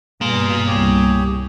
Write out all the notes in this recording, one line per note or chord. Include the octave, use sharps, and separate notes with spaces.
G2 B2 A#3 G#4 F5 C6
C2 G4 G#4 C#5